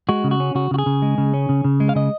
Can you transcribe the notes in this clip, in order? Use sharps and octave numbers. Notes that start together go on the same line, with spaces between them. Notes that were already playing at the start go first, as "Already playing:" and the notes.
G#3 F#4
C#3
F#4
C#4
C#3 F#4
C#3 F#4
G#4
C#3
G#3
C#3
C#4
C#3
C#3
G#3
F5
C#3 D#5